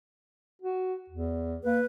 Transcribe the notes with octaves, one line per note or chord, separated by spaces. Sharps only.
F#4
E2
A#3 B4